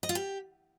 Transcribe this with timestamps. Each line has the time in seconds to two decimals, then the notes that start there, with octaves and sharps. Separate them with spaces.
0.03 D#5
0.09 F4
0.15 G4